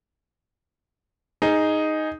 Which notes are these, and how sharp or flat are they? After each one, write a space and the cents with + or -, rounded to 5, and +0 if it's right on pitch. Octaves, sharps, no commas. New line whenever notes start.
D#4 +0 G#4 +0